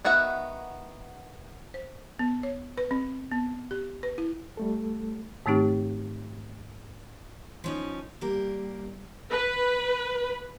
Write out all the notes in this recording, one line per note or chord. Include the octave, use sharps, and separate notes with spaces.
D#3 B3 F#4 E5 F#5
C5
B3
C#5
B4
C4
B3
G4
B4
E4
G3 A3 A4
G#2 D#3 A3 C4 D#4 G4
F3 C#4 D#4
G3 A#3 G4 A#4
B4